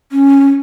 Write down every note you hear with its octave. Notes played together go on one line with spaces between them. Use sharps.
C#4